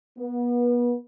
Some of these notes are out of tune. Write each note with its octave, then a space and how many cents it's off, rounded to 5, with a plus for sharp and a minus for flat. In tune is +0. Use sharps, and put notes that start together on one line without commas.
B3 -30